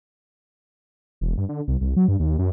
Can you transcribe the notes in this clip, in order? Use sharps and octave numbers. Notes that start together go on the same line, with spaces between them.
E1
G2
D3
C2
C2
F#3
G2
D#2
F#2